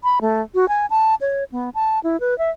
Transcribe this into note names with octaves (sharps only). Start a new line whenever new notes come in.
B5
A3
F#4
G#5
A5
C#5
B3
A5
E4
B4
E5